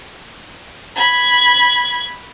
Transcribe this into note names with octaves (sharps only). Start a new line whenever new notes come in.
B5 G#6